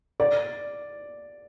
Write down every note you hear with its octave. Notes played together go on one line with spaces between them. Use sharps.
D5